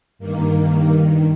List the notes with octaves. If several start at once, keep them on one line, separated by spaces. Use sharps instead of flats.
G2 D#3 A#3